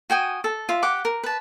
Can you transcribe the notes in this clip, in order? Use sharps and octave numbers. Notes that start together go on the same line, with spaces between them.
F#4 G5 G#5 D#6
A4
F4 E5
G4 F#5 D6
A#4
B4 A5